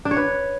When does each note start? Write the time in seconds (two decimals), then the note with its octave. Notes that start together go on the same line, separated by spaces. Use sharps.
0.05 D4
0.11 C#5
0.17 B4